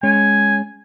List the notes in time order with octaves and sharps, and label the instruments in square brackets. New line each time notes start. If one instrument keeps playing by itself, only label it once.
[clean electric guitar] G#3 C#4 C#5 [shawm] G#5